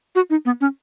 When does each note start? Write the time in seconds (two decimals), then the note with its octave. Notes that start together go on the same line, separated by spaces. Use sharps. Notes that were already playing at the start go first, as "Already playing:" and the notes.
0.15 F#4
0.30 D#4
0.45 B3
0.61 C#4